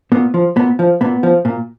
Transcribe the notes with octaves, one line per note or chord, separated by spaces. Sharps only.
A#2 B3
F3
A#2 B3
F3
A#2 B3
F3
A#2